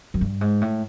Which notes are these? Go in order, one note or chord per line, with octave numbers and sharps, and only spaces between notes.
F#2
G2
G#2
A2